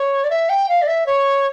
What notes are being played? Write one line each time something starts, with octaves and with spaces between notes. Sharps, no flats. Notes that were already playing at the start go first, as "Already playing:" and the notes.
Already playing: C#5
D5
E5
G5
F5
D5
E5
C#5